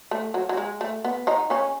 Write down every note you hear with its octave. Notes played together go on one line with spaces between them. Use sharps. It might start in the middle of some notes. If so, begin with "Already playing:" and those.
A3
F#3
F#3
G#3
A3
B3
D#3 D#4
C#3 C#4